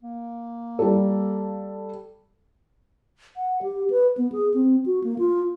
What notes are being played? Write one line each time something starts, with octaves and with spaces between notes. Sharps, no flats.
A#3
G3 A4
F#5
G4
B4
B3
G#4
C4
F#4
A#3
F4